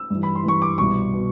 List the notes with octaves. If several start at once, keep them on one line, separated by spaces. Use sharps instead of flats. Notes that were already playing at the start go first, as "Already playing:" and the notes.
Already playing: E6
G2 E3
B5
C6
G2 E3 C#6
D6
C2 B2 C#6
B2